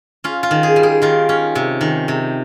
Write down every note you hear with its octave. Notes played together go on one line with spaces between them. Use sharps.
C#4 F4
F4
D#3
G#4
G3
G#4
D#3 F4
C#4
C3
D#3
C3